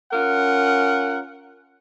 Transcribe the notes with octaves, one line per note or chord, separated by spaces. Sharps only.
C#4 F4 A#4 F#5